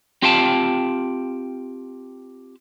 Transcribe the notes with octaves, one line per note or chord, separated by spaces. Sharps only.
C4 F4 G4 F5 G5 A5